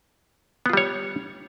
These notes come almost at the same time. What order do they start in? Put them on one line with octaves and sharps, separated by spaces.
B3 F4 G3 C#5